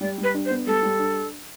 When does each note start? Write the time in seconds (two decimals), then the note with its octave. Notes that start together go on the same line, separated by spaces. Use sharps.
0.01 G3 D5
0.18 G3
0.23 B4
0.34 D4
0.46 C5
0.50 B3
0.67 G3 A4
0.83 G3
0.99 D4